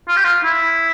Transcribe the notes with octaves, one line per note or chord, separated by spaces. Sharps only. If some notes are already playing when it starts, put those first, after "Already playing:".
F4
G4
F4
E4